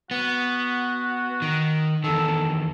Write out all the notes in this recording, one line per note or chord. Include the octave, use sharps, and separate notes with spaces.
B3 F#4
D#3
E2 D#3 A4